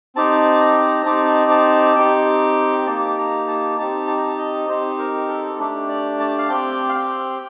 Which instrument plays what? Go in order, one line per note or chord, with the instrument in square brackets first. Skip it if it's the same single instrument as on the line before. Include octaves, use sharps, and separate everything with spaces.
[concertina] C4 D#4 G4 A5
A#5
C4 D#4 G4 A5
A5
C4 D#4 G4 G5
G5
A#3 D#4 G4 A5
A#5
A5
C4 D#4 G4 A5
A5
A#5
A5
D#5
C4 D#4 G4 C5
A#4
A4
A3 D4 G4
D5
A5
F5
C4 G4 G5
F5
G5